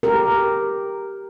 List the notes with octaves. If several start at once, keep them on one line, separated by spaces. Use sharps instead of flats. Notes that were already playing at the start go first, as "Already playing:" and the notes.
G4 A#4